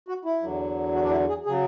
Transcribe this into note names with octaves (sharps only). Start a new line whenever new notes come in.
F#4
E4
E2 D3 F#3
F#4
D4
E4
G#4
C#3 F#3 G#4